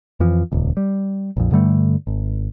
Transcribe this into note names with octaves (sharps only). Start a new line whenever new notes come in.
F2 E3 F3
D#1 C#2
G3
A#1 F2
G2 D3 G3 A3
G#1